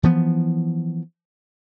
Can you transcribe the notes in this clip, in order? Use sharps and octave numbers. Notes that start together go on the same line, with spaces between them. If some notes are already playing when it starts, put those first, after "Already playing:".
E3 F3 B3